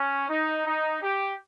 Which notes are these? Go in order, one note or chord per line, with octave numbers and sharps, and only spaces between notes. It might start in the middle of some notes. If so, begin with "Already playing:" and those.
Already playing: C#4
D#4
D#4
G4